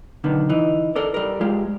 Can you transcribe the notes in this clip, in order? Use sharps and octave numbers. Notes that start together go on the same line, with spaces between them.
B1 D3 D#3 B3
E3 D#4
A4 A#4 D5
G3 A#4
G#3 F4 G4